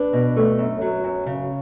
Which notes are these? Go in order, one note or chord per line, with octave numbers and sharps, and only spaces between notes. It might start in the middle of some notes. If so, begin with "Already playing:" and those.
Already playing: D4 B4
B2
A3
F#2
F#3
F#2
C#3